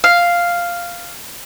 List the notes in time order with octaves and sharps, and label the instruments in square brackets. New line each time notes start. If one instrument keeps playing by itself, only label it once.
[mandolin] F5